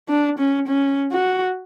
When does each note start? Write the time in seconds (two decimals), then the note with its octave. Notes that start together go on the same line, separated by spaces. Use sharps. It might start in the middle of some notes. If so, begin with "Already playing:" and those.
0.09 D4
0.39 C#4
0.68 C#4
1.12 F#4